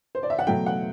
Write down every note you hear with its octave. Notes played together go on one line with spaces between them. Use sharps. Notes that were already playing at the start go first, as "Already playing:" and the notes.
C5
D5
E5
F#5
B2 F#3 A3 G5
F#5